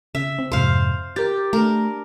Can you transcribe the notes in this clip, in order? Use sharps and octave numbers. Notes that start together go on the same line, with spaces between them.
C#3 E5
C4
F2 G#2 C3 C5 F5
G4 A#4 G6 A6
A3 D4 A#4